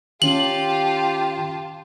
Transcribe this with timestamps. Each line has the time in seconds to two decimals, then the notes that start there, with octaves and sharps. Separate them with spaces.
0.22 D#3 C#4 F4 G4 A5 F#7